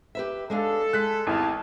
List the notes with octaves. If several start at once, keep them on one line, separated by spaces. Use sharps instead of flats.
G4 B4 E5
G#3 D4 A4 F5
G#3 F#6 B6
G#1 E2 G4 F5 A5